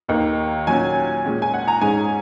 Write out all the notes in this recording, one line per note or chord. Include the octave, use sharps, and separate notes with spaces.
D#2 D#3 A#3 D#4
A#2 F#3 C#4 G#5
A#2 G#3 C#4
G#5
F#5
A#5
G#2 G#3 C#4 G#5